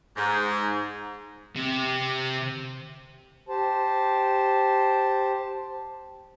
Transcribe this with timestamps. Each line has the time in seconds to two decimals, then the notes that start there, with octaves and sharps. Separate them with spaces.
0.16 G#2
1.56 C3
3.48 G4 C5 A5